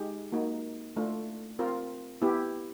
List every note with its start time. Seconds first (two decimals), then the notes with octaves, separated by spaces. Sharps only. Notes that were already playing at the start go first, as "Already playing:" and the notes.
Already playing: G#3 D#4 G4
0.32 A#3 D#4 F#4
0.96 A3 D4 F4
1.59 C4 F4 A#4
2.22 B3 E4 G4